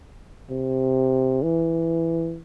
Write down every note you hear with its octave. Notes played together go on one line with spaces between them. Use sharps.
C3
E3